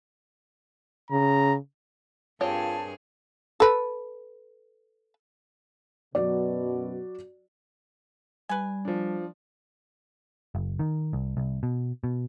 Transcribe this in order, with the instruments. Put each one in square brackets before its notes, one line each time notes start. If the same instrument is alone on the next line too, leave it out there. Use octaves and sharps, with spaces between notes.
[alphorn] C#3 [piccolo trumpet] A#5
[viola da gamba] G2 G#4 A#4 [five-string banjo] C4 G4 C#5 [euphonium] F4 [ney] A5
[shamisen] A4 B4
[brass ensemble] F#2 B2 [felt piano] F#3 F#4 D5
[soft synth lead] G3 [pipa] B4 G#5
[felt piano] F3 D4
[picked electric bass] F#1
D#3
C2
C2
B2
B2